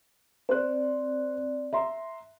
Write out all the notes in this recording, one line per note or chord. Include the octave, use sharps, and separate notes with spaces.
C4 C5 D5 F#6
E5 A#5 C6